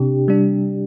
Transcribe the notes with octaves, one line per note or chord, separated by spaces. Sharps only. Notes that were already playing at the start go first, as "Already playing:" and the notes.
Already playing: C3 D4 G4
G3 D4